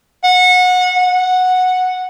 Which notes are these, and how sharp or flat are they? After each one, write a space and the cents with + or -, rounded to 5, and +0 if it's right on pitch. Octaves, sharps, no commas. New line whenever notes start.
F#5 -25
F#5 -10